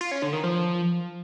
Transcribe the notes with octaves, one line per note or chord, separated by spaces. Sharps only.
F4
C#4
D3
D#3
F3